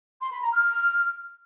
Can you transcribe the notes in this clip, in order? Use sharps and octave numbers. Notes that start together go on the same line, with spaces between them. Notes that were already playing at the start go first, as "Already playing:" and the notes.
C6
B5
A#5
F6